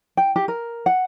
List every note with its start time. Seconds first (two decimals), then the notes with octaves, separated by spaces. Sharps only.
0.17 G5
0.36 G4
0.48 A#4
0.86 F#5